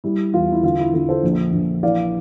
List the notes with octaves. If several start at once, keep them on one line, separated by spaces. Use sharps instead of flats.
G3 E4
E2 F4
E4
D3 F4
E4
D3 F4
A4 C5
A#1
A#1
E3 D5 F5